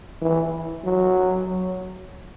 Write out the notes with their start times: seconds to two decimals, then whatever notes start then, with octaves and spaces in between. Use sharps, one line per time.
0.22 E3
0.84 F#3